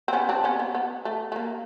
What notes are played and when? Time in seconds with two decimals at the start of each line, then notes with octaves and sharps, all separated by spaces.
0.08 C4
0.13 B3 C#4
0.29 C4 D4
0.44 B3 C#4
0.59 B3
0.74 B3
1.05 A3
1.32 A3
1.36 A#3